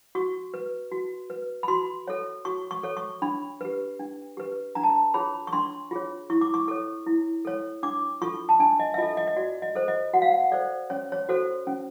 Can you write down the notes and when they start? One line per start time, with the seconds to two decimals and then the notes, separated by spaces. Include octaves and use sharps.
0.15 F#4 C#6
0.54 B4
0.92 F#4
1.30 B4
1.63 B5
1.68 F#4 C6
2.08 A4 C#5
2.45 F#4 C#6
2.71 C#6
2.83 A4 C#5
2.97 C#6
3.22 D4 B5
3.61 G4 B4
3.99 D4
4.37 G4 B4
4.75 D4 A#5
4.83 A5
4.90 A#5
5.14 F4 G#4 C#5 B5
5.47 C#6
5.53 D4 C6
5.91 F4 G#4 C#5
6.30 E4 C#6
6.41 D6
6.54 C#6
6.68 A4 C#5
7.06 E4
7.45 A4 C#5
7.83 D4 D6
8.22 F4 A4 C#6
8.49 A5
8.60 D4 G#5
8.80 D#5
8.94 E5
8.98 F4 A4 D#5
9.17 D#5
9.27 D#5
9.36 F#4 D5
9.62 D#5
9.75 A4 C5
9.88 D#5
10.13 F#4 F#5
10.22 F5
10.31 F#5
10.52 A4 C5 D5
10.90 C#4 C#5
11.12 C#5
11.29 F#4 A4 C5
11.67 C#4